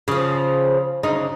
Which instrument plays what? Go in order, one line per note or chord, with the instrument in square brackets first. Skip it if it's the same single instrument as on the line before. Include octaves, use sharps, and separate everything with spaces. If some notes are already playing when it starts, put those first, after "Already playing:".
[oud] C#3 F3
D2 C#3 D#4